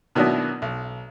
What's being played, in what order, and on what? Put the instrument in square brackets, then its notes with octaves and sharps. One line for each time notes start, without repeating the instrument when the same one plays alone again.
[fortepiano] B2 D#3 F#3 B3 D4 E4
B1